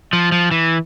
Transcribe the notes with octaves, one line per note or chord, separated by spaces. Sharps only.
F3
F3
E3